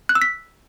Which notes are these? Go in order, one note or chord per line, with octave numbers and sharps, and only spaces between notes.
F#6
E6
B6